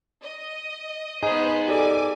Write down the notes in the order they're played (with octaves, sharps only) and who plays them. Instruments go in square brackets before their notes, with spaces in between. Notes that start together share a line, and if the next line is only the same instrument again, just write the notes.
[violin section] D#5
[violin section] B3 B4 C5 [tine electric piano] D#4 G#4 [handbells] G#5
[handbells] G4 A4 D5 [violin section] G#5 D6